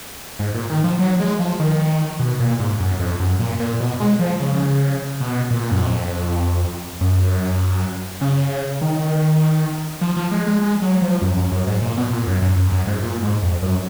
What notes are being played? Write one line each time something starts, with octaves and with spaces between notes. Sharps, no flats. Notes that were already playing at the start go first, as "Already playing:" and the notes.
G#2
A#2
D#3
F3
F#3
G#3
F3
D#3
B2
A#2
G#2
F#2
F2
F#2
A#2
A#2
B2
G#3
F3
C#3
B2
A#2
F#2
F2
F#2
C#3
D#3
F3
F3
G#3
G#3
G#3
F#3
F3
F#2
F#2
F#2
G#2
A#2
B2
A#2
F#2
F#2
F#2
F#2
G#2
A#2
G#2
F2
F#2